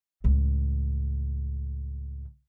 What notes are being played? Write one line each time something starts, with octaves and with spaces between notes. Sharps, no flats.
C#2 A2